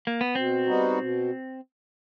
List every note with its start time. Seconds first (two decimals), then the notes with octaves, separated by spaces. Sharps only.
0.07 A#3
0.21 B3
0.35 B2 C4
0.66 G3 B3 D#4 F#4
0.98 B2